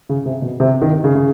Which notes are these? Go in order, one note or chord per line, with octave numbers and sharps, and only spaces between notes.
C#3
C3
B2
C3
D#3
C#3
C#3